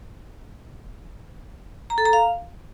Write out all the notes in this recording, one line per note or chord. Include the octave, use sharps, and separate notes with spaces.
A#5
A4
A#5
F5